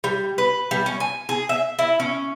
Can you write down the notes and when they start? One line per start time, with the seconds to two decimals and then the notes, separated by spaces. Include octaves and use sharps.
0.04 G3
0.38 B4
0.71 G3
0.86 C#4
1.00 G#5
1.29 G#4
1.49 E5
1.79 E4
2.00 C#4